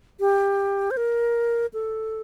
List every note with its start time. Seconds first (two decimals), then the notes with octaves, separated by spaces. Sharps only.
0.20 G4
0.91 C5
0.97 A#4
1.74 A4